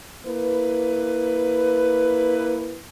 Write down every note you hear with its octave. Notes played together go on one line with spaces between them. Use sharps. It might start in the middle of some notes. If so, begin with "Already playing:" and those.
A#3 E4 B4